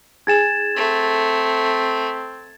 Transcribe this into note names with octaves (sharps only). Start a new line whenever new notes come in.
D#4 G#4 G#5 G#6 A6 E7
A3 C4